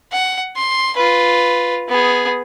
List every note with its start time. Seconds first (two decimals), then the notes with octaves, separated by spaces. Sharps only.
0.12 F#5
0.56 C6
0.96 F4 B4
1.89 B3 G#4